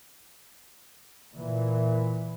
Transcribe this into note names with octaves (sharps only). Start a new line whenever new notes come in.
A#2 E3